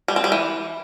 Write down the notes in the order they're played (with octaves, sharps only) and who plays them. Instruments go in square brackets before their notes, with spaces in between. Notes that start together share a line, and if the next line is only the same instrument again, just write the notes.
[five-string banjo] G3
C4
G3
E3